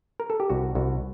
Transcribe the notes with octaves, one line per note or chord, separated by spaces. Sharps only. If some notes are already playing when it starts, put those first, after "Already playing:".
A#4
A4
G4
C2 F#4
C2 F#4